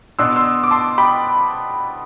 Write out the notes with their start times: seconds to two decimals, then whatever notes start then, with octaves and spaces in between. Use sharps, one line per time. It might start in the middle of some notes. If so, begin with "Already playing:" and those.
0.19 B2 B3 D4 C6 E6
0.36 C6 E6
0.64 D6
0.71 A5 C6
0.98 G5 B5